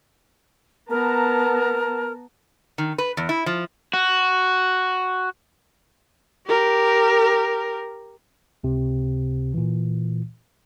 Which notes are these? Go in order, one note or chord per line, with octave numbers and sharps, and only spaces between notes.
B3 A#4 A5 A#5
D#3
B4
E2
E4
F3
F#4
G4 A#4
C#2 C3
A#2 E3